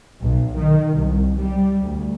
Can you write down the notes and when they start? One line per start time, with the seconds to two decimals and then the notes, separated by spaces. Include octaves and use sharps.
0.21 B1
0.58 D#3
0.95 C2
1.38 G3
1.81 D2